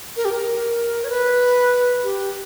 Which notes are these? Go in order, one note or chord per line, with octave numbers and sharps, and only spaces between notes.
A#4
G4
A#4
C#5
B4
G4